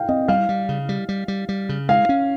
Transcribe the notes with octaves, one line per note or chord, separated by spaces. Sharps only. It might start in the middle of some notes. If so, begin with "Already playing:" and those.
Already playing: F5 G5
C4 D#5
G3 F5
G3
C#3
G3
G3
G3
G3
C#3
G#3 F5
C#4